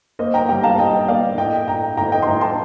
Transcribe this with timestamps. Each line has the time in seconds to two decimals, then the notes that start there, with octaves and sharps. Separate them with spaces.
0.19 A#3 C5 D#5
0.34 G5 A#5
0.49 G3 G5 A#5
0.63 F5 A5
0.78 G3 D#5 G5
1.08 A#3 D5 F5
1.38 A2 D#5 G5
1.67 A2 G5 A#5
1.97 A2 G5 A#5
2.12 D#5 G5
2.22 C6
2.27 A2 G5 A#5
2.41 A5 C6